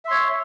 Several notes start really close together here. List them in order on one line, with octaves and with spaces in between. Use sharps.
E5 C6 C#5